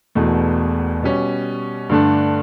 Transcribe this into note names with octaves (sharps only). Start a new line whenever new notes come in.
E1 E2 B2 A3
B2 G3 C#4
G2 D3 A3 D4